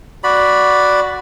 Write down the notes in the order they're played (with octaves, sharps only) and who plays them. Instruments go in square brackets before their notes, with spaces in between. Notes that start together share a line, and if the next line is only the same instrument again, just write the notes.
[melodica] F#4 D5 B5